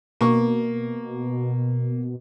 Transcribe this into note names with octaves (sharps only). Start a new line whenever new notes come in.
B2 A#3 C#6